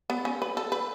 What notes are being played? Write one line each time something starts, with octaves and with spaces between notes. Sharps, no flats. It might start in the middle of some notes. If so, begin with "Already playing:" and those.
B3
C#4
B4
A4
B4